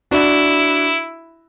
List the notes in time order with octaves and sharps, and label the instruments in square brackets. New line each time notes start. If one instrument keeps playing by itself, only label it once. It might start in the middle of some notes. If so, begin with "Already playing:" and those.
[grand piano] D4 F#4 [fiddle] E4